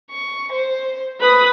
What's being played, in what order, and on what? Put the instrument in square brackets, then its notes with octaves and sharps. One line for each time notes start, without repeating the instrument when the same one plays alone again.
[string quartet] C#6
C5
B4 B5 D#6